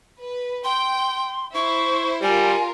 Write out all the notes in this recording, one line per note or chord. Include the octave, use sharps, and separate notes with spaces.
B4
G5 C6
E4 C5 C#6
G3 F4 A#4 G#5